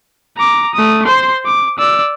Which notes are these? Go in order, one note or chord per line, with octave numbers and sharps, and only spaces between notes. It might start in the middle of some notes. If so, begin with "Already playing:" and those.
A#5 D6
A3 D#6
C5 C6
D6
D5 E6